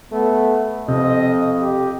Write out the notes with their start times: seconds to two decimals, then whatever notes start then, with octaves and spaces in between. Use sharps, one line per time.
0.12 A3 B3
0.88 F2 C3 D#5
1.60 G4